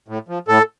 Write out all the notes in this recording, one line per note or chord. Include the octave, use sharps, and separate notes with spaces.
A2
F3
A2 A4